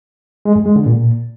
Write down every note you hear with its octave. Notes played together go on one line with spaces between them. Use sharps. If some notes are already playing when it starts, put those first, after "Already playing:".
G#3
F#2
G#3
D3
A#2